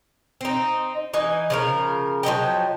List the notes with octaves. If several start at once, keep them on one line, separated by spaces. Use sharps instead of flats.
C4 D#4
E3 D#4 G#5
C#3 F3 A#4
F3 F#3 D#4 G5